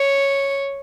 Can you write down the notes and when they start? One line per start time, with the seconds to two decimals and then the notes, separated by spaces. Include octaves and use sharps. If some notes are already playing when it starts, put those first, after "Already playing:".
Already playing: C#5